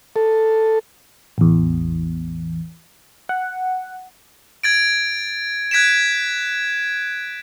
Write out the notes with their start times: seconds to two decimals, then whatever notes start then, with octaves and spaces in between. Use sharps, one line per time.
0.16 A4
1.38 A1 E2
3.29 F#5
4.64 G#6 A6 D7
5.71 F#6 G#6 B6 D7 E7